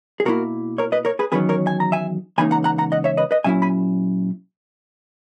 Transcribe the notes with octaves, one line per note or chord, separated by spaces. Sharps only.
G#4
B2 A#3 E4 F#4 A#4
A#4 C#5
B4 D#5
A#4 C#5
G#4 B4
E2 D#3 F#3 C#4 G#4 B4
A#4 C#5
G#5
A#5
E5 G#5
C#2 C#3 E3 A#3 D#4 G#5 B5
F#5 A#5
F#5 A#5
F#5 A#5
D#5 F#5
C#5 E5
B4 D#5
B4 D#5
A#2 F#3 C#4 E4 E5 G#5
G#5 B5